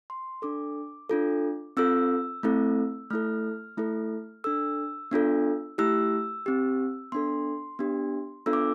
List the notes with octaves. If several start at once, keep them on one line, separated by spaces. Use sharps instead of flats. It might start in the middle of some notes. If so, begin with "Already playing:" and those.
C6
D4 A4 D6
D4 F4 A4
C4 F4 A4 E6
A3 C4 E4 A4
A3 E4 A4 F6
A3 E4 A4
D4 A4 E6
B3 D4 F4 A4
A3 E4 G4 E6
C4 G4
B3 D4 A4 C6
B3 D4 G4
B3 D4 F4 A4 E6
D6